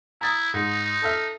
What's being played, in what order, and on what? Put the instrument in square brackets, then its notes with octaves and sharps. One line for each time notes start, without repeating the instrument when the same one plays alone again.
[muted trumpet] E4 [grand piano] A#5 D#6 A6
[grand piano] G#2 [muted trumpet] D#4
[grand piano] A4 E5 F6